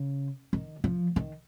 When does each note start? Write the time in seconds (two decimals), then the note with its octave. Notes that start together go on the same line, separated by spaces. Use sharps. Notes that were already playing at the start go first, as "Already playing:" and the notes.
Already playing: C#3
0.53 D#3
0.84 F3
1.16 D#3